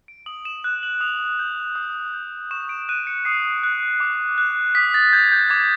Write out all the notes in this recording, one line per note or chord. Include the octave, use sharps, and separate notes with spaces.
D7
D#6 F#7
E7
F#6
F#7
D#6 F7
G6
D#6
G6
C#6 E7
D7
F#6 D#7
C#7
D#6 C7
F#6
D6
F#6
D#6 B6
A6
G6 G#6
G6
D6 G#6